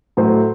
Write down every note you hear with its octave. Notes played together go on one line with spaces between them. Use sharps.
A2 F#3 A3 C5